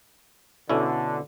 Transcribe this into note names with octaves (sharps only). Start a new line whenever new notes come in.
B2 D3 C#4 E4